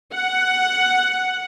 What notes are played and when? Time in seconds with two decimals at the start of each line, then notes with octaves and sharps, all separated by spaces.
0.14 F#5